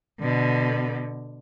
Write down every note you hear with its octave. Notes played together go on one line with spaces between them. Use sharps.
B2 D3